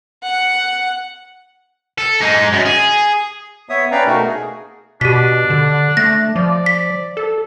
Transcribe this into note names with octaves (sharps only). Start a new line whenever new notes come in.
F#5
A4
G#3 D#4
F#2
G#4
B3 C#5 E5 D#6
C#4 B4 D5 F5 G5 A#5
B2 A3 D#4 F#4 A#4
G#4
B2 D4 G4 B6
D3
A3 A#6
F3 D5
B6
A4